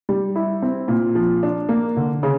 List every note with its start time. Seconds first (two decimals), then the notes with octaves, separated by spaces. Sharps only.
0.09 G3
0.36 E4
0.62 C4
0.88 A#2
1.15 F3
1.43 D4
1.69 A#3
1.97 D3
2.23 C#3